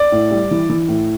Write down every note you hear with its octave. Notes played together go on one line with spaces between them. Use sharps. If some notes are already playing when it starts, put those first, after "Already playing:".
Already playing: D5
A2
G3
E3
E3
A2